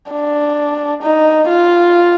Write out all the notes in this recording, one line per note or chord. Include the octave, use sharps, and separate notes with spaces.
D4
D#4
F4